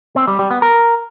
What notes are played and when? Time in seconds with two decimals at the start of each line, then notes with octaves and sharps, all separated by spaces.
0.16 C4
0.27 G3
0.39 G3
0.51 B3
0.62 A#4